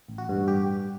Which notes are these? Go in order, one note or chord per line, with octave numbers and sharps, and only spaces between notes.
A1
F#4
G2
G4